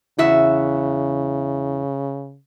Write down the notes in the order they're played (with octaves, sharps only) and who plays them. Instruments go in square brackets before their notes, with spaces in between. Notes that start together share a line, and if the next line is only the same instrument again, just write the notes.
[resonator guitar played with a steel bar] E2 F#4 E5 [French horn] C#3 [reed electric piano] E4